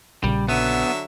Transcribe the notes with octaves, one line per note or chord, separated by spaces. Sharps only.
A#1 A#2 C#3 G3
D3 F#3 B3 E5